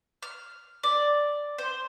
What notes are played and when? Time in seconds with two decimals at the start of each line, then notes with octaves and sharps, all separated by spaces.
0.23 F6
0.83 D5
1.58 C5